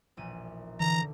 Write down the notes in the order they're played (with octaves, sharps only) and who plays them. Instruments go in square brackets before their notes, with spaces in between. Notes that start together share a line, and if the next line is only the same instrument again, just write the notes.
[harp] E1 A#1 D#7
[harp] E1 D3 [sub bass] E3 [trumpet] A#5